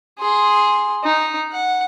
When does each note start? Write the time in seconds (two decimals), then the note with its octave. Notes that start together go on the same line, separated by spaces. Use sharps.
0.19 G#4 C6
1.04 D#4
1.52 F#5